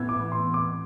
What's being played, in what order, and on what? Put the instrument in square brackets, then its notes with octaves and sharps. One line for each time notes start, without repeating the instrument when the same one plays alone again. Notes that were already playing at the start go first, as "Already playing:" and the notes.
Already playing: [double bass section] A2 E3 B3 [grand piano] E6 G#6
[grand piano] D6
C6
D6